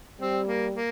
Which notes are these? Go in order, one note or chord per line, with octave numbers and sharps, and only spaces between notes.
G3 C4
A#3
A#3